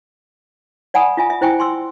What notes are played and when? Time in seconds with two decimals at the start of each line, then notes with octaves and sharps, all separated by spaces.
0.94 D5 F#5 G#5 B5 D#6
1.17 F4 E5 G#5
1.30 E5
1.41 E4 C5 E5 G5 G#5 C#6
1.59 G#5 C6 C#6 E6